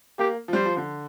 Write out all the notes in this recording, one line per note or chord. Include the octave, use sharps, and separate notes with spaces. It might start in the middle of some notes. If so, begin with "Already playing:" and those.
A#3 G4
F3
G3 C5
F3
D3